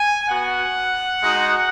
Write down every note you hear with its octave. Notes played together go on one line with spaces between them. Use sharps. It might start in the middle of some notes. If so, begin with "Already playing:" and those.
Already playing: G#5
B3 F#4 F#5
G#3 D#4 F#4